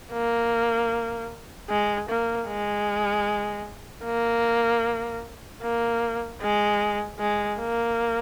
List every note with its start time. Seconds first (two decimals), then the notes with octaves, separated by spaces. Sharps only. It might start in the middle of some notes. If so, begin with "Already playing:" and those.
0.13 A#3
1.70 G#3
2.09 A#3
2.48 G#3
4.05 A#3
5.63 A#3
6.41 G#3
7.20 G#3
7.59 A#3